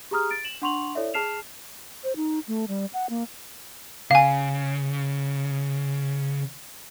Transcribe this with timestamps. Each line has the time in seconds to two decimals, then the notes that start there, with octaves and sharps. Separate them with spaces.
0.11 G4 G#4 A#5 D#6 F6
0.31 A6 D7
0.44 E7 F#7
0.62 D4 F#5 C6 C#6 F7 F#7
0.95 E4 A4 C#5 D5 E5
1.14 G#4 A5 F6 C7 E7 F7
2.04 C5
2.16 D#4
2.48 A3
2.68 G3
2.94 F#5
3.10 A#3
4.11 C#3 F5 G#5